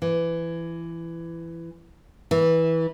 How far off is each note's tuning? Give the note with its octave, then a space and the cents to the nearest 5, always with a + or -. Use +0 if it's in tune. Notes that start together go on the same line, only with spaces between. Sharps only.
E3 +20
E3 -15